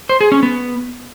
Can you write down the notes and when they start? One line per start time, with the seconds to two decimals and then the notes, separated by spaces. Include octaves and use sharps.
0.09 C5
0.21 G#4
0.32 C#4
0.43 B3